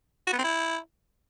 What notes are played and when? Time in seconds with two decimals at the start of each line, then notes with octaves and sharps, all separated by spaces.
0.27 F#4
0.33 B3
0.38 C4
0.44 E4